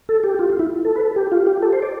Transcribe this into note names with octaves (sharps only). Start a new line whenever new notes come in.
A4
G4
F4
F4
E4
A4
B4
A4
G4
F4
G4
A4
C5
D5